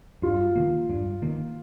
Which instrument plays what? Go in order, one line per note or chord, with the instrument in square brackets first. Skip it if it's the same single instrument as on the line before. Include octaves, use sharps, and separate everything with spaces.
[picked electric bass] G2 [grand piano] F4
[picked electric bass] D#3 A#3
G2
D#3 A#3